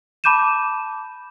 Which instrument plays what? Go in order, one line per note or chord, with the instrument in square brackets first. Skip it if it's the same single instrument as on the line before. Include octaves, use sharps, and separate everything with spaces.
[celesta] A5 B5 D6 G6 D#7 E7